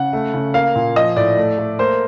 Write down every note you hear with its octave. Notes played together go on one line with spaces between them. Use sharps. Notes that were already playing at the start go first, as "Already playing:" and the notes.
Already playing: C#3 F#5
A3
C#3
A#3 F5
A#2
F3 D#5
A2 D5
A3
A3
A#3 C5